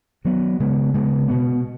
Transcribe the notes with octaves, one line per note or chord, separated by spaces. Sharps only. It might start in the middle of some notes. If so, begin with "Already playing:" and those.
D#3 F#3 B3
C#3 G#3 B3
C#3 G#3 B3
B2 B3